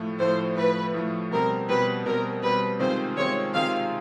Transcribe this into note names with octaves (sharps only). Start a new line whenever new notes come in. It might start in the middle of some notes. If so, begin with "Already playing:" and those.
Already playing: A2 F3 A3
A2 F3 A3 C5
A2 F3 A3 B4
A2 F3 A3
B2 G3 C4 A#4
B2 G3 C4 B4
B2 G3 C4 A#4
B2 G3 C4 B4
C3 D#3 G#3 C4 F4 C5
C3 D#3 G#3 C4 F4 C#5
C3 D#3 G#3 C4 F4 F5